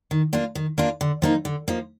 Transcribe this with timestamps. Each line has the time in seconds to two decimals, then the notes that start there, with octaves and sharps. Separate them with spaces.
0.11 D#3
0.33 A#3 D4 F4
0.55 D#3
0.78 A#3 D4 F4
1.01 D3
1.22 F3 A#3 D#4
1.45 D3
1.68 F3 A#3 D#4